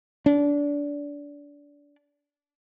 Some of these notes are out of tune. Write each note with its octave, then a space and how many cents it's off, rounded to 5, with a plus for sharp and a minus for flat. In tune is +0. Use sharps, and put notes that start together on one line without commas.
D4 -25